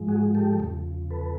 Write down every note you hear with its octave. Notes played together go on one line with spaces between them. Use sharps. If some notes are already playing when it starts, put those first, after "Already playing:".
Already playing: G#2 F3 G#3
F#4 G#4
G4 A4
E2 C#3 F3
A4 B4